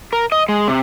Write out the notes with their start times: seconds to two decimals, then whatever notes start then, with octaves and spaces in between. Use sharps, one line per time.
0.13 A#4
0.32 D#5
0.49 G#3
0.68 C3